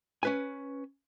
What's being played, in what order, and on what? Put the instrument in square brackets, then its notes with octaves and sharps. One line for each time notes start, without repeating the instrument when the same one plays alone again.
[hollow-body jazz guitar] C#4 B4 G#5